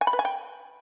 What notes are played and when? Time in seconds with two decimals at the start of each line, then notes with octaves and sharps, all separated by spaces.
0.01 G#5
0.07 B5
0.13 B4
0.19 G#5
0.25 G5